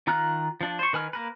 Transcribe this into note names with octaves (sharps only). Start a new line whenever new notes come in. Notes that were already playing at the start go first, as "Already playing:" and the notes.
D#3 F4 A#5 F6 F#6
F3 D4
C5 C#6
D#3 B4 G#5 F6
A#3 A#4 B4